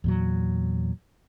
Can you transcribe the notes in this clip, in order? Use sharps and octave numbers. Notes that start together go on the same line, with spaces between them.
E2 A#2 F#3